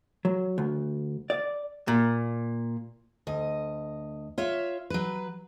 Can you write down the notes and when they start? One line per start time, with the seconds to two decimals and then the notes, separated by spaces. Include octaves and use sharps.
0.25 F#3
0.58 D2
1.30 D5
1.88 A#2
3.27 D2 D#5
4.38 F4 C#5 E5
4.90 F#3 B4